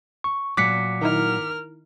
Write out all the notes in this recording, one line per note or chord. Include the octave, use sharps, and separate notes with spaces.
C#6
A#2 F#3 D6 F#6 B6 C#7
D#3 D#4 E4 A#4 F6